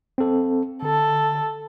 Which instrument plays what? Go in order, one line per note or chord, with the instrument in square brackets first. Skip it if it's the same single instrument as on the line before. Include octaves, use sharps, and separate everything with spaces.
[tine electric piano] C4 A4
[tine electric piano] D3 [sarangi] A4